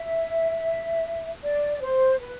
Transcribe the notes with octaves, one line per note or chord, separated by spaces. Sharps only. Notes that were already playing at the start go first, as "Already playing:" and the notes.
Already playing: E5
D5
C5
B4